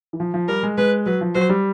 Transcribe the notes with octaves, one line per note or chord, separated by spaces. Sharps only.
E3
F3
F3
G3 A#4
G#3
G#3 B4
F#3 B4
F3
F#3 C5
G3